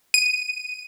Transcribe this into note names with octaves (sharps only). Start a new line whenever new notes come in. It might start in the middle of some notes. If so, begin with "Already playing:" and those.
D#7